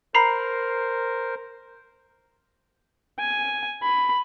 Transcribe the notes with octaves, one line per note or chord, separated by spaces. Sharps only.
A#4 C5 A#5 B5 C7
G#5
B5